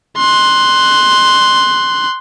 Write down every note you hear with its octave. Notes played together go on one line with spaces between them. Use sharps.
C6 F#6